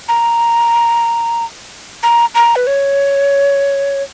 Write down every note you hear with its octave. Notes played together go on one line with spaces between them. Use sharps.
A#5
A#5
A#5
B4
C#5